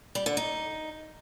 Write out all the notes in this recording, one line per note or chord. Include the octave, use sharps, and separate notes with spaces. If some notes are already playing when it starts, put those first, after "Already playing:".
G3
D3
D#4